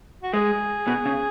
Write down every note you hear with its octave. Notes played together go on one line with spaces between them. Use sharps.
F#4
G#3 G#4
B2
C#3